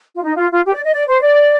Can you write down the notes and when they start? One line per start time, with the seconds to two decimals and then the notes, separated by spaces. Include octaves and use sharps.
0.16 F4
0.23 D#4
0.37 F4
0.51 F4
0.66 G4
0.74 D5
0.85 D#5
0.94 D5
1.08 C5
1.22 D5